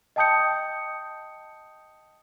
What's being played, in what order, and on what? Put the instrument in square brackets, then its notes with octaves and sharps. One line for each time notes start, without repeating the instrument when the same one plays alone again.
[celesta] D#5 G5 A5 D#6 G6 C#7